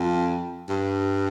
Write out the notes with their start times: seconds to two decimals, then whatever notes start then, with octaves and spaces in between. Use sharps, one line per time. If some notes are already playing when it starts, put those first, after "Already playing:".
Already playing: F2
0.69 G2